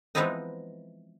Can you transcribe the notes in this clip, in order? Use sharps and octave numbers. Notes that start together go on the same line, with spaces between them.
E3 F3 G#3 B3 C4 D#4